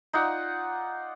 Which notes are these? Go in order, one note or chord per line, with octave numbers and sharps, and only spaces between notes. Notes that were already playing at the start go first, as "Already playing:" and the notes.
D#4 F4 D5 F#5